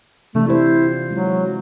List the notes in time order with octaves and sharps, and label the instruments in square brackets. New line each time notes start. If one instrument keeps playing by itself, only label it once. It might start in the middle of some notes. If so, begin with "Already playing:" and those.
[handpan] C3 E3 D4 [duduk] A3
[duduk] E4 [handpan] G4 C5
[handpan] F4
[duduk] F#3 [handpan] G#3 E4